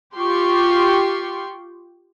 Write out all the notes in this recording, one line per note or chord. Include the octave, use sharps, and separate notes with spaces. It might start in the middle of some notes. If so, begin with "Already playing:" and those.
F4 G4 G5 C6 C#6